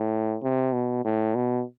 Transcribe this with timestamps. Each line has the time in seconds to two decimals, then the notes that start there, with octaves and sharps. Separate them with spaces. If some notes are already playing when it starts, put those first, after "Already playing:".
Already playing: A2
0.43 C3
0.73 B2
1.05 A2
1.35 B2